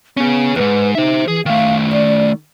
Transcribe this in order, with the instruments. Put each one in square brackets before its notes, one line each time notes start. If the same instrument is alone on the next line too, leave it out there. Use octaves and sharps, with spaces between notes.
[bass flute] B3 [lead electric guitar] C#4 G#4
[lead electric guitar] D#2 G#2 [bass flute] B4
[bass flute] D#4 [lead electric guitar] C5 E5
[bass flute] E3 [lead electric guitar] G#4
[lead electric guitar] D#3 A3 [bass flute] F5
[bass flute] D5